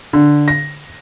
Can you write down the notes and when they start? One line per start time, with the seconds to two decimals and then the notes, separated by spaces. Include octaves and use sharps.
0.13 D3
0.48 A#6